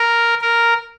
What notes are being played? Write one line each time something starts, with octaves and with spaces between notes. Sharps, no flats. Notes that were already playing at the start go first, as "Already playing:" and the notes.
Already playing: A#4
A#4